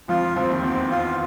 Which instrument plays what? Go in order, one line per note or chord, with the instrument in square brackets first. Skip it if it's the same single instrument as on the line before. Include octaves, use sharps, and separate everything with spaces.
[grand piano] F2 F3 [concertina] F4
[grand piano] F2 F3 [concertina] C4
[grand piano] D#2 D#3
[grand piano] E2 E3 [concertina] C4
[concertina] F4